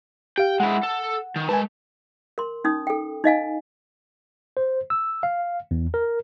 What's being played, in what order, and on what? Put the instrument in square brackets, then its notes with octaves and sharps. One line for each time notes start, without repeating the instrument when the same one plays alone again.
[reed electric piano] G4 F5 [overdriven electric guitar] G5
[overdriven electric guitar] G#3 E4 [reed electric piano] F#5
[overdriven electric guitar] A4
D#3
[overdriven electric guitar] G#3 A5 [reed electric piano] B4 G#5
[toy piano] A#4 C6
C#4 D#4 D#6
A4 G5
D#4 D#5 F5 G#5
[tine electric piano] C5
E6
F5
E2
A#4